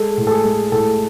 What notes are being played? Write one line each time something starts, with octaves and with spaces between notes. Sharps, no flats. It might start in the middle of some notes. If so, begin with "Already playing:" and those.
Already playing: G#3 A4
A2
A4
G#4
G#3
A2 A4